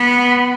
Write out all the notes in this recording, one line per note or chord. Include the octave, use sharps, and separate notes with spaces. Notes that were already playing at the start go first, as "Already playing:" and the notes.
Already playing: B3